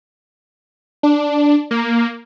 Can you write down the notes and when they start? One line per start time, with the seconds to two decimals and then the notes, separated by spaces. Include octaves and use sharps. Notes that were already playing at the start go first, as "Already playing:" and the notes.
1.03 D4
1.71 A#3